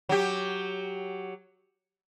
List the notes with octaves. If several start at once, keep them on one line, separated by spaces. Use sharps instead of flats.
F#3 G4